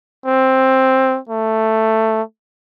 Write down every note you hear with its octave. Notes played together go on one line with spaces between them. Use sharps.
C4
A3